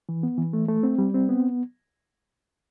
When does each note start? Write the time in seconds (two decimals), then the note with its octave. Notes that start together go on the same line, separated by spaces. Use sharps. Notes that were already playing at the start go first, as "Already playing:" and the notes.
0.09 E3
0.23 B3
0.38 E3
0.53 A3
0.68 A3
0.83 C4
0.98 G3
1.14 C4
1.29 B3